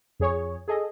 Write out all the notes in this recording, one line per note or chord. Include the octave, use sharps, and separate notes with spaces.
F2 G#4 C#5
G#4 A4 D#5